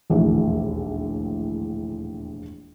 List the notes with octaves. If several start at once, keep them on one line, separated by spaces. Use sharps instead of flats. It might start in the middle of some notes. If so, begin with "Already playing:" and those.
E1 A#1 D#2 A2 E3